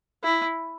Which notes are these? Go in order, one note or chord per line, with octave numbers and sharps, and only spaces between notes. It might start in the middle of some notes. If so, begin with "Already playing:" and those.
E4